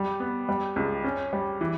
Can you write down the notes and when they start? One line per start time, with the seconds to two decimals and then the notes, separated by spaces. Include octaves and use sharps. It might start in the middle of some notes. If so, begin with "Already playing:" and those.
Already playing: G3
0.20 B3
0.49 G3
0.76 C#2
1.04 C#4
1.33 G3
1.61 E3